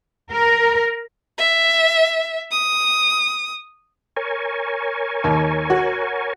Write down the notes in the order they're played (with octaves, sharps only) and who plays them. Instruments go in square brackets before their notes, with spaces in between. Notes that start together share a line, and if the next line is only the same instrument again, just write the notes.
[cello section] A#4
[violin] E5
D#6
[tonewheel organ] A#4 C#5 G#5
[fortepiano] D#2
F#4